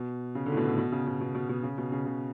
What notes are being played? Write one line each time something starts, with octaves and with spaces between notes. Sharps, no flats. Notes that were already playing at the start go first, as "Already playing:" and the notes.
Already playing: B2
C#3
D3
A2
B2
A2
B2
C#3
B2
B2
B2
B2
C#3
B2
C#3
C#3